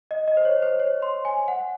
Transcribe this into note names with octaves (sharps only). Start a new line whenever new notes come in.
D#5
D#5
C5
C#5
C5
C#5
C6
G#5
F#5